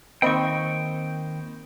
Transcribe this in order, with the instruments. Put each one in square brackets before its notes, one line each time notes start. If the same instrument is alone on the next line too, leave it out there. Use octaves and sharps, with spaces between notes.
[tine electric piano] D#3 A#3 [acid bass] C4 [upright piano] C5 D#5 B5 [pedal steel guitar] G5 C#6